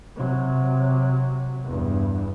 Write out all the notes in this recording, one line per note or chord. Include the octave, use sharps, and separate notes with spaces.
C3 F#3
E2 G2